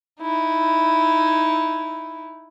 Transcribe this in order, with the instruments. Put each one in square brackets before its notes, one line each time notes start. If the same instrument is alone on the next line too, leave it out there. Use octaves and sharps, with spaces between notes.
[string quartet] D#4 E4